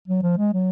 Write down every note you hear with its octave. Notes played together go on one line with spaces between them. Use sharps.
F#3
F3
G#3
F#3